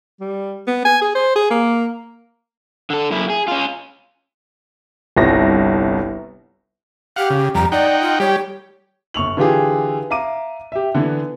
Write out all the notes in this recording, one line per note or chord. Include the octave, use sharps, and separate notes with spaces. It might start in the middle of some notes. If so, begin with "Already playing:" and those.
G3
B3
G#5
G#4
C5
G#4
A#3
D3 A4
F#2 E4
G#4
C#4 F4
G1 C2 A#6
G4 F5 F#5
C#3
F2 G3 A#5
D#4 D5 F#5 G5
F4
G3 G4 C#5
G1 C#6 F7 F#7
D3 E3 F4 G4 G#4
E5 F5 A#5 D6 D#7
G4 E5
D3 E3 B3